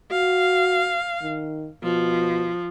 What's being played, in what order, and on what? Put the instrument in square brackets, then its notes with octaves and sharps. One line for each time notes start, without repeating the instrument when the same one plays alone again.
[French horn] F#4 [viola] F5
[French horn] D#3
[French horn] B2 [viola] F3